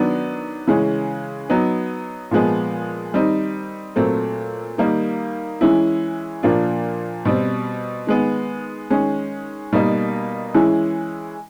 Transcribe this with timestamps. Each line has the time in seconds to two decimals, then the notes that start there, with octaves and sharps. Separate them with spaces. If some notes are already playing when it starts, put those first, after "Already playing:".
Already playing: D#3 F#3 B3 D4
0.67 C#3 E3 G#3 C#4
1.50 F#3 B3 D#4
2.31 A#2 F3 G#3 B3
3.14 D#3 G3 C4 D#4
3.96 A#2 F#3 A3 C4
4.78 D#3 G3 A#3 D#4
5.61 E3 G#3 C#4 E4
6.43 A#2 F3 A#3 D4 F4
7.25 B2 G3 C4
8.07 D#3 G#3 B3
8.90 D#3 G#3 C#4
9.73 B2 G3 A#3 D#4
10.54 E3 G#3 C#4 E4